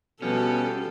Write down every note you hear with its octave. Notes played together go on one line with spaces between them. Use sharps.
B2 F3 G3 C#4 A4